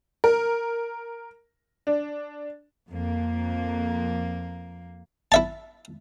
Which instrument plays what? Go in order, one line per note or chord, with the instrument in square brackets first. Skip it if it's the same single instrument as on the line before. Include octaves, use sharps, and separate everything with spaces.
[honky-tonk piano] A#4
D4
[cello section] F2 A#3
[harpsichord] E4 E5 A5